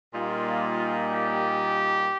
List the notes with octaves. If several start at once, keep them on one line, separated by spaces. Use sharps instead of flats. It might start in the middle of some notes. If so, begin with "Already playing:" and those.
A#2 G3 A#3 D#4 F4
G4